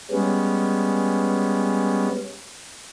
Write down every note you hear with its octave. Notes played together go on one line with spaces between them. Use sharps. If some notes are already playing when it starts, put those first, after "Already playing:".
G3 G#3 B3 C#4